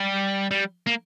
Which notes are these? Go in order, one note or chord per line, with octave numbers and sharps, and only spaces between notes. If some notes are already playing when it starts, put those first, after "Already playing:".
Already playing: G3
G3
A#3